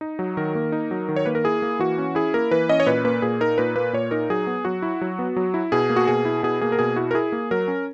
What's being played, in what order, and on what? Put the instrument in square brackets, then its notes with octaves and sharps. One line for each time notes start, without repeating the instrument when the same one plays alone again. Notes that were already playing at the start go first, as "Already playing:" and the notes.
[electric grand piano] D#4
F#3
D#3 A#4
A#3
D#4
F#3
D#3
C#5
A#3 B4
A#4
E4 G#4
A#3
E3 F#4
C#4
E4 G#4
A#3 A#4
E3 B4
C#4 D#5
C#5
A#2 B4
A#3 B4
A#2 G#4
D#4 A#4
A#2 B4
A#3 B4
A#2 C#5
D#4 A#4
F#3 G#4
B3
F#3 F#4
E4
F#3
B3
F#3
E4
B2 G#4
A#3
F#4
B2 G#4
E4
B2 G#4
A#3 G#4
A#4
B2 G#4
E4 F#4
A#4
E4 G#4
A#3
F#3 A#4
C#4